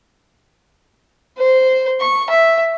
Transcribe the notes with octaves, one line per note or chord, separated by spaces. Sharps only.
C5
C#6
E5